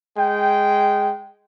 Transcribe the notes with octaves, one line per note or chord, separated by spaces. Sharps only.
G#3 G5